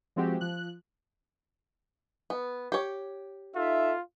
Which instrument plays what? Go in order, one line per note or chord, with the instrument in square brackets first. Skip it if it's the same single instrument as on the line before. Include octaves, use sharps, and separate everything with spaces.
[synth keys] F3 G#3 C4 F#4 G4
F3 F#6
[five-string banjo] B3
G4 C#5
[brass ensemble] D#4 A4 E5 [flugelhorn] F4